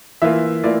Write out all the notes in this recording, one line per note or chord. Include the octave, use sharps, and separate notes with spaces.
E3 A#3 F4 E5
E3 A#3 F4 D5